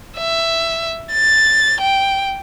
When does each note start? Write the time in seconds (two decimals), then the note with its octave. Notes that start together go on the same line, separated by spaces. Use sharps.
0.17 E5
1.12 A6
1.80 G5